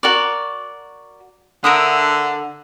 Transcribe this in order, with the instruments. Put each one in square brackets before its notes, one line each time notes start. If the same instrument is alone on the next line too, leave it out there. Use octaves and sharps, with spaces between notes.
[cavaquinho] F#4 A#4 D5
[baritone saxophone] D3 [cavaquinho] A#4 E5 D#6